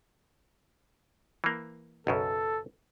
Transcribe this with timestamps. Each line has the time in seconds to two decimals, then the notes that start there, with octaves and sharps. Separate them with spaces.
1.44 E3 A#3
2.07 B1 F#2 C#3 A4